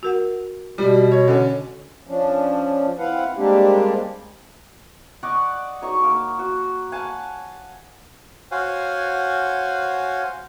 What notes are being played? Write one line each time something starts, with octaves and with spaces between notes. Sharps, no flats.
F#4 A#4 F#5
B2 G3 F4 D5
C#5
D3 C#4
F3 C#4 D4
C4 E4 B4 F5 F#5
G3 G#3 A#3 C4 D4 G4
D5 D#5 F#5 C#6
D#4 F#4 C#5 C#6
A#3 D6
F#4
F5 F#5 G#5 A5
F#4 C5 C#5 F5 F#5 G#5